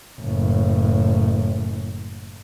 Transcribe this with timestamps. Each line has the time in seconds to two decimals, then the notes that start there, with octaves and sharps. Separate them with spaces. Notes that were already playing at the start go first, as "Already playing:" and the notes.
0.21 F#1 A2